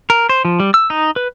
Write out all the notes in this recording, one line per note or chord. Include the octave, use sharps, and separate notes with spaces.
A#4
C5
F3
G3
E6
D#4
B4